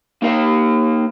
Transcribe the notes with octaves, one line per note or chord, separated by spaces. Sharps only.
A#3 D#4 A#4 F5